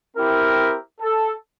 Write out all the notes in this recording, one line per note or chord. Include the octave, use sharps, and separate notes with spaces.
C4 E4 G4 A#4
A4